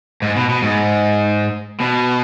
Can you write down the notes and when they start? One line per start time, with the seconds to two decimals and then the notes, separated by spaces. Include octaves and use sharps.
0.22 G#2
0.36 B2
0.49 B2
0.62 G#2
1.80 B2